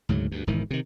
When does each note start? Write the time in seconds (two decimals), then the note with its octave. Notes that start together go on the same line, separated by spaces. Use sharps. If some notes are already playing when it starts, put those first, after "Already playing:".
0.09 D2 G#2 C#3 F#3
0.32 D2 G2
0.47 E1 G#2 D#3 E3
0.71 C3 D#3